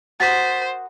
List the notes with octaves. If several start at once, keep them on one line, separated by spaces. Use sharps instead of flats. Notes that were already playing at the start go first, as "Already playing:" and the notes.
F#4 A#4 C5 D#6 A6 B6